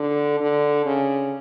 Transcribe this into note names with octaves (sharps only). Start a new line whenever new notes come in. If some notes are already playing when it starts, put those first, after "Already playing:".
Already playing: D3
D3
C#3